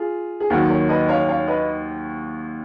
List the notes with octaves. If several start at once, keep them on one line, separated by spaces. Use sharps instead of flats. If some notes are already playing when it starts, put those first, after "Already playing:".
Already playing: F4 G#4
G#4
D#2 D#3 F#3 F#4 A#4
A#4 C#5
B4 D#5
C#5 F5
C#5 F5
B4 D#5